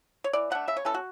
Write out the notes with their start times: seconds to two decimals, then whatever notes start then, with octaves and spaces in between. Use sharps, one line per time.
0.24 C#5
0.33 E3 D5
0.51 A3 D4 F#5
0.68 C#3 E5
0.77 C#5
0.85 E3 A3 C#4 A4
0.94 F#4